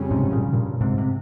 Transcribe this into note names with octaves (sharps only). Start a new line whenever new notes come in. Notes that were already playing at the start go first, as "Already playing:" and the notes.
Already playing: F2 C#3 G3 C#4
G#2 C3
A#2 C#3
G2 A#2
G#2 C3
C3